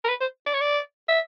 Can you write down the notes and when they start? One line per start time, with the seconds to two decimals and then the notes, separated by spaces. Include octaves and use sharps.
0.04 A#4
0.09 B4
0.21 C5
0.46 D5
0.54 C#5
0.61 D5
1.08 E5